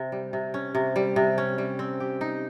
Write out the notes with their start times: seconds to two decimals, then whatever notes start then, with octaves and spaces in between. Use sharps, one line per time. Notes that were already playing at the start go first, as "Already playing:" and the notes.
Already playing: C3
0.12 G3
0.33 C3
0.54 C#4
0.75 C3
0.96 G3
1.16 C3
1.38 C#4
1.58 G3
1.79 C4
2.00 G4
2.21 D#4